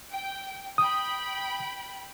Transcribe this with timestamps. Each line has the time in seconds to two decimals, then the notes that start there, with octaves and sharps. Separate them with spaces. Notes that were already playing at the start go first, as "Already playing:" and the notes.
0.10 G5
0.78 G5 B5 D#6